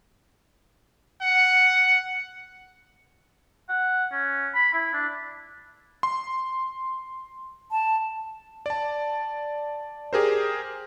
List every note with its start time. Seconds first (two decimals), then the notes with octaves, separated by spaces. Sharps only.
1.22 F#5 C#7
3.69 F#5
4.12 C#4
4.54 B5
4.73 E4
4.93 D4
6.03 C6
7.71 A5
8.66 D5 A5
10.13 G4 G#4 A#4 C5